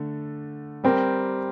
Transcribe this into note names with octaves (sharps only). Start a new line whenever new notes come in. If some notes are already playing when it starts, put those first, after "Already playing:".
Already playing: D3 A3
G3 C4 G4 A#4